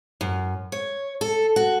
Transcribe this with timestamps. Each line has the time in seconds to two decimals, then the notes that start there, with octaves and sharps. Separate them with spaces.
0.21 F#2
0.72 C#5
1.21 A4
1.56 F#4